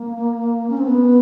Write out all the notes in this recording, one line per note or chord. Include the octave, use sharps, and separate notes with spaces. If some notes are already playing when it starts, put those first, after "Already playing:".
Already playing: A#3
C#4
C4
B3